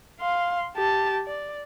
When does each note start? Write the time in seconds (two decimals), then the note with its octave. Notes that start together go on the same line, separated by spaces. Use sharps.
0.20 F5 C6
0.76 G4 A5
1.27 D5